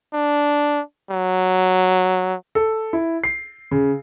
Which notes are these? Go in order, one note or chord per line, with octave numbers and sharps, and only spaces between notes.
D4
F#3
A4
E4
C7
C#3